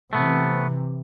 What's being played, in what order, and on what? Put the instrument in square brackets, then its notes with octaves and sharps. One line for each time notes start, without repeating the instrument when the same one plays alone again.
[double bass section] C3 E3 [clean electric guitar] A3 B3